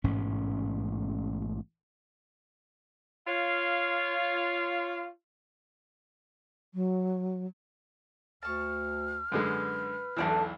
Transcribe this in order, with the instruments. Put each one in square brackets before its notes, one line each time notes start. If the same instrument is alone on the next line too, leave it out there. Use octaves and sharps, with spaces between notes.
[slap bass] A1 G#2 B2 C#4
[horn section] F4 C#5 F5
[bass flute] F#3
[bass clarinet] D2 [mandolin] A5 C#6 [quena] F6
[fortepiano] F#2 D3 G#3 [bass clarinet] B4
[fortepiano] B1 E2 E3 [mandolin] A3 D4 E6